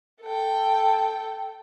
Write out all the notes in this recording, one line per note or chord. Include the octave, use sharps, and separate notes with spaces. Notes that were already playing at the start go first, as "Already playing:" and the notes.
A4 G5